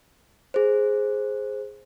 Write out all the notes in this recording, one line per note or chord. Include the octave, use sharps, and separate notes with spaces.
G#4 C5